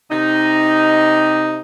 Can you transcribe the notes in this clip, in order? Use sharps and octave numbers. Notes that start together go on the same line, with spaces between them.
C3 D#4